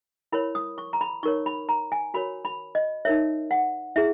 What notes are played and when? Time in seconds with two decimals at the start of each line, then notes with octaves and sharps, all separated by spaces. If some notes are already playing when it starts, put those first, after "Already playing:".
0.32 E4 A#4 C#5 B5
0.55 D#6
0.78 C#6
0.93 A#5
1.01 B5
1.23 D#4 A#4 C#5 C#6
1.46 B5
1.69 A#5
1.92 G#5
2.14 F#4 A#4 C#5 B5
2.45 B5
2.75 D#5
3.05 D#4 A#4 C#5 E5
3.51 F#5
3.96 E4 G#4 E5